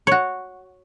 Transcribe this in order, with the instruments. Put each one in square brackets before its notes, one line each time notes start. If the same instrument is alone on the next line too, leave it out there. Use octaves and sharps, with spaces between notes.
[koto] F#4 C#5